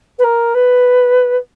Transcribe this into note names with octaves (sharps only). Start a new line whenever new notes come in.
B4
A#4
B4